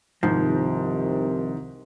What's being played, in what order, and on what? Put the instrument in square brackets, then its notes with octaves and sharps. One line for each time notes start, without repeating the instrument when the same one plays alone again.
[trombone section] C2 C3 D#3 [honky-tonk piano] G#2 [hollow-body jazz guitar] F3